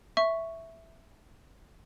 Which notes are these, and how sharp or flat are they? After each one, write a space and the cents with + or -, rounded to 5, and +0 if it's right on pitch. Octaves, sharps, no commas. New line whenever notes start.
E5 +0 C#6 +0